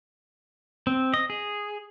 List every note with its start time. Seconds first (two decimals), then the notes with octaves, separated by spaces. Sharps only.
0.87 C4
1.14 D#5
1.30 G#4